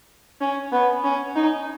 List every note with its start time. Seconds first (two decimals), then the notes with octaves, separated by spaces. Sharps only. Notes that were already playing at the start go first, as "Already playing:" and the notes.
0.41 C#4
0.72 B3
1.04 C#4
1.36 D#4